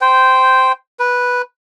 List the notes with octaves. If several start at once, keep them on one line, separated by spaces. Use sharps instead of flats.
C5 G5
B4